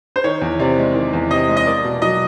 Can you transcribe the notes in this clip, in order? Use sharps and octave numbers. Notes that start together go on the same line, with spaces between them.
C5
D#3 C#5
E2
C3 D5
G#3
D#3
E2
C3 D#5
G#3
D#5
A#3 D5
B2
F#3 D#5